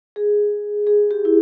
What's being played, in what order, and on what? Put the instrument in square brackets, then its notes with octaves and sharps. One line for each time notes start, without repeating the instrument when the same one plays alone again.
[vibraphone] G#4
G#4
G4
E4